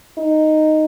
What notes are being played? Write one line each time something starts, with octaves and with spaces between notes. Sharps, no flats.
D#4